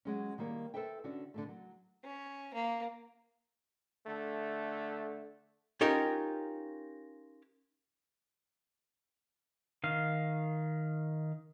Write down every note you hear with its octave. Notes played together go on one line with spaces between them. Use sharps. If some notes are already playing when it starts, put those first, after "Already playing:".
F#3 G#3 C#4
D#3 G3 A#3 C#5
A4 B4 C5 E5 G5
D3 C#4 D4 F#4
D3 F#3 A3
F#3
C#4
A#3
D3 A3
C#4 D#4 F4 G4 A#4
D#3 F5